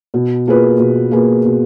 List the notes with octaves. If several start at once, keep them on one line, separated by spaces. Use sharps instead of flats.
B2
A#3 F4 G#4 B4
B2
A#3 F4 G#4 B4
B2